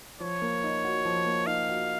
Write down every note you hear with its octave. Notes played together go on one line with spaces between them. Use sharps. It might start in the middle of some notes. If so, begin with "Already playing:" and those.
F3 C#5
A#3
D#4
F#4
F3
A#3
D#4 F5
F#4